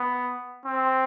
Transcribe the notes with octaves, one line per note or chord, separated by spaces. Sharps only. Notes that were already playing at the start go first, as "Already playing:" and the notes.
Already playing: B3
C4